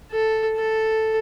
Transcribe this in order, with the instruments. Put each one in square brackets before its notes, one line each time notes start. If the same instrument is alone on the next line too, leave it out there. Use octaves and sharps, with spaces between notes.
[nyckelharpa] A4
A4